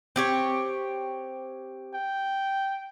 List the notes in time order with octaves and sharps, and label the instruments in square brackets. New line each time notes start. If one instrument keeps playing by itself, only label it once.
[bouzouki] C4 G4 C#5
[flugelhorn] G5